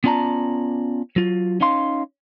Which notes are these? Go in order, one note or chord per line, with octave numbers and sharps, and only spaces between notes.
B3 C#4 F4 D5 A5 A#5
F#3 F4
C#4 D#4 F5 C6